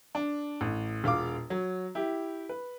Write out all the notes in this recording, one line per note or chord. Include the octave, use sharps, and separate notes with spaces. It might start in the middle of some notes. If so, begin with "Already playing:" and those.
D4
A1
E1 F4 F5 D6
F#3
E4 G4
B4